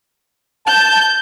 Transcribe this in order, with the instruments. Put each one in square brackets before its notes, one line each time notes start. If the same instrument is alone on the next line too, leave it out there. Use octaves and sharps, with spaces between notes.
[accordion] A5 [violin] G6